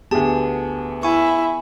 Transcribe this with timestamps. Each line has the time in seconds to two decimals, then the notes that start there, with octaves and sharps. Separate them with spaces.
0.11 D2 B3 G4 G#4 A5
1.03 E4 G#5 C#6